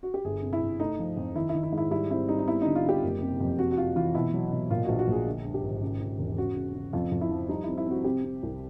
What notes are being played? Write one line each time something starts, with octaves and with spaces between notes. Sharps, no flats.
F#4
G4
G1 G#4
C3
E4
G1
A3 D#4
F3
F2
D#3 E4
E4
D#3
E4
G#2
E4
G3 E4
C4 E4
G3 D#4
D#4
B3 E4
D3 D#4
F4
D3 G4
F#1
C3
F2
C3 F#4
F#4
C3 F4
E3 F4
B2 E4
F#3
B2
A#2 F4
A#1 F#4
F#4
A#1 G#4
D3
G2
G4
G#1
C#3
C#3
E1
C#3 F#4
C#3
C#3
F2 F4
F2
E4
F3
G3 D#4
C4 E4
E4
C4 F#4
C3 G4
C3
C2